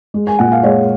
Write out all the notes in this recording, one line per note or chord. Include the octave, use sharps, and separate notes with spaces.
G#3
G#5
A#2 F#5
F5
G#3 C#5